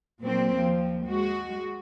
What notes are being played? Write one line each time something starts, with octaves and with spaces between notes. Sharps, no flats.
A#2 F#3 A#3 C4
D#2 F3
G#3 F#4